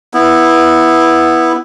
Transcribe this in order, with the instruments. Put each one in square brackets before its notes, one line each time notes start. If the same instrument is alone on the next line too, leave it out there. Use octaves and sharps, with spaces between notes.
[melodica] B3 E4